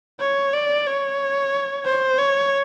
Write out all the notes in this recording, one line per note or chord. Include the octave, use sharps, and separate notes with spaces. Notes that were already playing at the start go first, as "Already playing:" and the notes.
C#5
D5
C#5
C5
C#5